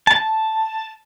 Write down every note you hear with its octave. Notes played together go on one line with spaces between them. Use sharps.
A5